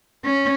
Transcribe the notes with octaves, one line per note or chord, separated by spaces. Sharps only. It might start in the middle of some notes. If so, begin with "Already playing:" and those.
C#4